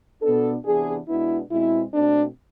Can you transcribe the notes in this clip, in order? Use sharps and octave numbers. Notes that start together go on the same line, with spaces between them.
B2 B3 D4 A4
C3 E3 B3 D4 G#4
B2 G#3 B3 D4 E4
B2 G#3 C4 E4
B2 A3 C4 D4